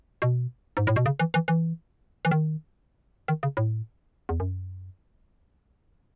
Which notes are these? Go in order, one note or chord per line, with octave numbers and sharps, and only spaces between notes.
B2
G#2
A2
B2
C#3
E3
E3
E3
E3
D#3
D#3
C#3
A2
E2
F#2